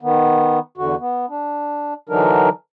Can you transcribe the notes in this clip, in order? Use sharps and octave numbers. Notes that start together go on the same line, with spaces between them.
D#3 B3
E2 D3 F#4
B3
D4
D3 E3 F#3 D4 D#4 A#4